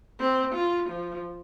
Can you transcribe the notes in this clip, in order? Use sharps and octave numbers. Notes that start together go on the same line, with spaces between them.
C4
F4
F3